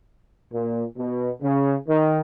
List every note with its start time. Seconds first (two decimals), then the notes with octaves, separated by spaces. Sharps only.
0.53 A#2
0.98 B2
1.42 C#3
1.89 D#3